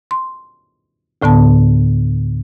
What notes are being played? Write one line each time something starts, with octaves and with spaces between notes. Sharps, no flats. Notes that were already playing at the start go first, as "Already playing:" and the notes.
C6
D2 A2 D3 B3 A5